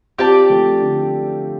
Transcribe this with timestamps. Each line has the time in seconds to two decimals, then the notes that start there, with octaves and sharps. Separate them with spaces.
0.19 C4 F4 G4 D5 A5
0.50 F3 A3
0.81 D3